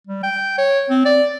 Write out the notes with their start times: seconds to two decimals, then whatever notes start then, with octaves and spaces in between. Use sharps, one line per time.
0.07 G3
0.23 G5
0.58 C#5
0.90 C4
1.05 D5